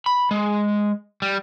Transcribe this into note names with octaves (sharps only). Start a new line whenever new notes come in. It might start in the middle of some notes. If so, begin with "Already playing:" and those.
B5
G#3
G3